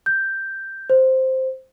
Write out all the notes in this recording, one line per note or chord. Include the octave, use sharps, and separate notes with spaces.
G6
C5